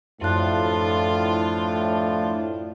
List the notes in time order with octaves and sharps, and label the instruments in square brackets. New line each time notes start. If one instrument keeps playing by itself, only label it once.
[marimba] F#2 F#6 [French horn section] A2 [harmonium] F3 D4 [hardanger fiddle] F4